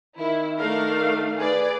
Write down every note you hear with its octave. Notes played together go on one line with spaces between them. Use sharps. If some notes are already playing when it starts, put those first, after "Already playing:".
D#3 E4
A3 D4 A#4 F5
G#4 B4 D5